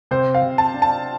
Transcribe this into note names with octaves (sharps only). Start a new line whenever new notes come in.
C3 C5
F5
C3
A5
D4
A5